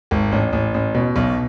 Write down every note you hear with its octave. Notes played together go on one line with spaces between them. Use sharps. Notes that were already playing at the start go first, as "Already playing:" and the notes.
G#1
A1
A1
A1
B2
B1